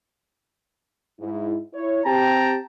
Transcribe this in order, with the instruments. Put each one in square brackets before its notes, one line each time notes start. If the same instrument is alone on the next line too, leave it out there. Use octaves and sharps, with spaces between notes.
[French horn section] G#2 E4
E4 C#5
[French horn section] C4 G4 [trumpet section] G5 A5 A#5